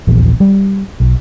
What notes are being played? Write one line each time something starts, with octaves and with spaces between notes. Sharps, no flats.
D#1 A#1 E2
G3
B1